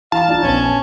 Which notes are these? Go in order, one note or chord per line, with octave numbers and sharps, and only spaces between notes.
E3 F5 A5
D4 D#4 F4
A#1 B3 C#4
G#5